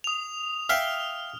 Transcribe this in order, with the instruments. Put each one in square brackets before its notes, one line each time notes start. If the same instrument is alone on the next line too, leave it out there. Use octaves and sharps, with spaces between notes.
[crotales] D#6 F7
[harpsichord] E5 F5 G5 [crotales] F6